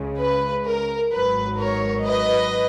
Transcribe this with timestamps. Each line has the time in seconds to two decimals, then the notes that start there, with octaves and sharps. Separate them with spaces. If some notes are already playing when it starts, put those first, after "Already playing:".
Already playing: C#2 C#3 G#3
0.20 B4
0.66 A#4
1.12 G#1 G#2 F#3 B4
1.57 A#4 C#5
2.04 B4 D#5